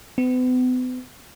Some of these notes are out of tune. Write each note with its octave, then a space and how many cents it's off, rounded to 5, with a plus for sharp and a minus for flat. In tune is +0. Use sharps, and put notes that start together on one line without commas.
B3 +40